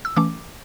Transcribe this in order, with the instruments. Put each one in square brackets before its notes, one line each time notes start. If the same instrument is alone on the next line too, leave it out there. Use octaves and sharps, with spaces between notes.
[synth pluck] E6
E3 A3 C#4 D6